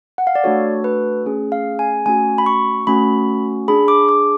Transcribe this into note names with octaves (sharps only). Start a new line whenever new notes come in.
F#5
F5
D5
A3 D4 F#4 A4 C#5
B4
A3 C#4 G#4
F5
G#5
A3 C#4 F#4 G#5
B5
C#6
A3 C#4 F#4 B5
D4 G#4 B5
D6
D6